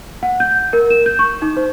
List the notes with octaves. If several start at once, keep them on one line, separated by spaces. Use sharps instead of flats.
F#5
G6
A#4
E7
G6
C#6
D#4
C5